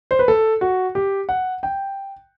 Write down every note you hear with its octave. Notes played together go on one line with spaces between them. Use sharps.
C5
B4
A4
F#4
G4
F#5
G5